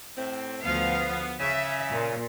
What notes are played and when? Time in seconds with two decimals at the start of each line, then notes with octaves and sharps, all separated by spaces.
0.17 A2 C4
0.63 D2 F3 B3 F5
1.40 C#3 E5
1.91 A#2